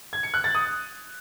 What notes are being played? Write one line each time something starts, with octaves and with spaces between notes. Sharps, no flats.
G#6
C#7
F#6
A6
D#6